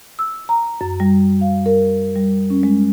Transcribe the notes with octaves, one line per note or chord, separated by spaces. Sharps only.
E6
A#5
F#2
G3
F5
A#4
G3
C#4
G#3